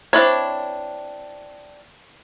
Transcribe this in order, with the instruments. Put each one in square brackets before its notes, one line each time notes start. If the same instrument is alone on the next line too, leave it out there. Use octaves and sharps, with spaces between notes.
[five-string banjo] C4 D4 E4 C#5